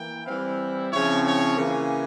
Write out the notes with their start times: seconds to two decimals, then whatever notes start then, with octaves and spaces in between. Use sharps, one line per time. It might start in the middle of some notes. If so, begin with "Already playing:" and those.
Already playing: E3 A#3 G5
0.24 E3 G3 C4 E4 F5
0.91 C#3 F3 C4 E4 C#5
1.24 C#5
1.57 C#3 E3 A#3